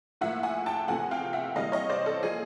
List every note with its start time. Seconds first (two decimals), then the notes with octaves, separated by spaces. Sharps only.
0.21 A2 F3 A#3 E5 F#5
0.43 F#5 G#5
0.66 G5 A5
0.88 E2 C3 F3 A3 F#5 G#5
1.11 F5 G5
1.33 E5 F#5
1.56 C3 E3 G3 A#3 D#5 F5
1.72 C#5 D#5
1.89 C5 D5
2.06 A4
2.23 A#2 F3 A#3 G#4